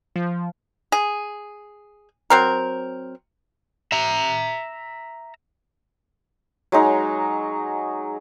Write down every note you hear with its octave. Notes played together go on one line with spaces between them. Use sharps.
F3
G#4
F#3 C4 A#4
E5 A#5
F#3 G#3 D#4